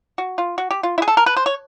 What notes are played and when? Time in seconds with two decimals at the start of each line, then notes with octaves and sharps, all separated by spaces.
0.18 F#4
0.38 F4
0.58 F#4
0.71 G4
0.83 F4
0.98 E4
1.02 G#4
1.08 A4
1.17 A#4
1.26 B4
1.37 C5
1.46 C#5